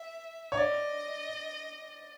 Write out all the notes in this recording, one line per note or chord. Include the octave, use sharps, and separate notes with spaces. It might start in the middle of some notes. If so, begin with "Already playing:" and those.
Already playing: E5
C#5
D5 D#5